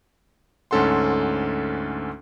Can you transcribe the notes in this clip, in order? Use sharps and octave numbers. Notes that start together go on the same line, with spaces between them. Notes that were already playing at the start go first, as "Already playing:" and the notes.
D2 G#2 C#4 A4 F#5 C6